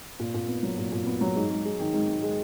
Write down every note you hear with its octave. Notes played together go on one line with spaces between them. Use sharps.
A#2
A#2
B3
F#3
A#2
A#2
B3
F#3
G#2
G#2
G#3
D#3
G#2
G#2
G#3